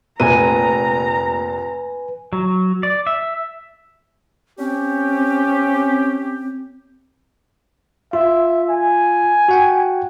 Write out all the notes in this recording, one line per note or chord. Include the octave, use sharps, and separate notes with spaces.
F1 A#2 B4 G#5 A#5 D#7
F#3
D5
E5
C4 C#4 G4
F4 E5
G#5
F#4 F#5 G5